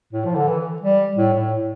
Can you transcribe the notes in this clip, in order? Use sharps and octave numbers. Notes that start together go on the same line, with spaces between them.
A2
F3
D3
E3
G3
A2
A2